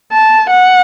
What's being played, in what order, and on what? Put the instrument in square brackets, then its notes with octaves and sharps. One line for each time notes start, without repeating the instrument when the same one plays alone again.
[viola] A5
F#5